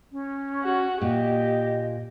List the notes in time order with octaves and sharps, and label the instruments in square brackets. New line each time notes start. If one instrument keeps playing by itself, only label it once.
[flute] C#4
[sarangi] F#4
[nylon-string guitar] A#2 [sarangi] G4 [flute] D#5